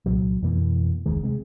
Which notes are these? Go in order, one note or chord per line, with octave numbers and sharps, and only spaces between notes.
C2 A#2 F#3
F2 B2 E3 A#3
F1 D2 D#3 G#3
C3 G#3